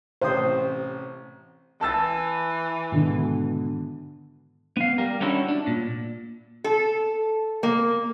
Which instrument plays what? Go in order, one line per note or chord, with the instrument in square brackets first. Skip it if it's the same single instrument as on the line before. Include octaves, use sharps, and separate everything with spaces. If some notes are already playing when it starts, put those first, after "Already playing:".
[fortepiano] A1 C3 D#6 [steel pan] C5
[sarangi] E3 [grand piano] A5 E6 A6
[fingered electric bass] G#2 D#3 [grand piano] B2 D3
[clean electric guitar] B3 F5
G3 A#4
G3 B3 C#4 D4 E4 F#4
D4
A#2
[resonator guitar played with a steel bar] A4
A#3